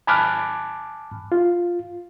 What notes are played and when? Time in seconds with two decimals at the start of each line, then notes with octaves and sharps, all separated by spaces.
0.07 G#5 A5 B5 D6 F6 F#6
1.32 F4